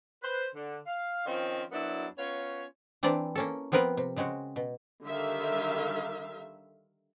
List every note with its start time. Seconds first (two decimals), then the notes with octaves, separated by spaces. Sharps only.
0.23 B4 C5
0.55 D3
0.87 F5
1.26 D#3 F3 C4 C#4 F4
1.72 F#2 F#3 B3 D4 E4
2.18 B3 C#4 F4 C#5
3.03 E3 C4 D4 E4 D5 A#5
3.35 A#3 C#4 A4
3.72 F3 B3 C4 A#4 B4
3.97 C3
4.16 C#3 G#3 C4 F#4
4.56 B2
5.04 D3 D#3 G3 E5 F5